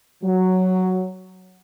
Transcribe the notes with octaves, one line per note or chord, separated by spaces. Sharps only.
F#3